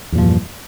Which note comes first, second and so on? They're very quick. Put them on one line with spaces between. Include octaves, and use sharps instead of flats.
E2 A#2 F3 G2